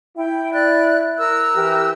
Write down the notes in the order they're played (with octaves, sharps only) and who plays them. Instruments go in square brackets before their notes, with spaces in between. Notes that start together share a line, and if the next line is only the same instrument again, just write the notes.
[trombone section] E4 [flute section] G5
[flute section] D5 F#6
A#4 E6 F#6
[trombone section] E3 G4